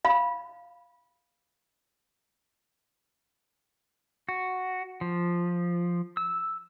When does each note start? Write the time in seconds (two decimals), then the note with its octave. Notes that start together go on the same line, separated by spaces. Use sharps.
0.05 F5 B5
4.29 F#4
5.01 F3
6.17 E6